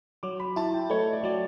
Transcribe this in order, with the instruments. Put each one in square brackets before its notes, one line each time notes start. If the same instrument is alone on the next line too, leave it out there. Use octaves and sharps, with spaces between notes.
[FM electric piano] F#3 [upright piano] D6
[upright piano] B5
[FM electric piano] E4 [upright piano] A5
[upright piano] G5
[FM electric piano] A3 [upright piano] C#5
[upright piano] D5
[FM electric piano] F#3 [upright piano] D5